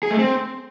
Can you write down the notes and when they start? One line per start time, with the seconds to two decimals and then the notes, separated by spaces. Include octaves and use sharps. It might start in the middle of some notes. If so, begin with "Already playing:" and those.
0.03 G#4
0.11 A3
0.19 C4